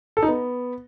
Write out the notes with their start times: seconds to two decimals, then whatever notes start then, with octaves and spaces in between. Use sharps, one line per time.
0.17 A4
0.23 D#4
0.28 B3